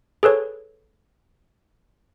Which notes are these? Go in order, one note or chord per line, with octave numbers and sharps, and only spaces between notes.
G#4 A4 B4 C#5